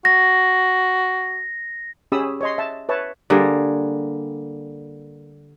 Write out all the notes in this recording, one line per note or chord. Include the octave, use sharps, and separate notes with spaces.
F#4 A#6
C#4 G4 G#4 B5 D#6 E6
C#5 D#5 C6
E5 A5
B4 C#5 E5 A5
D3 G3 A#3 G#4